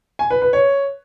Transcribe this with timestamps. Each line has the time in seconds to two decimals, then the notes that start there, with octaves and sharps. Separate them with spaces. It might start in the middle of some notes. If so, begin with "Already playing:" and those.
0.19 G#5
0.30 B4
0.42 B4
0.53 C#5